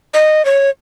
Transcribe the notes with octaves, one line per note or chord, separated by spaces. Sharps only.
D#5
C#5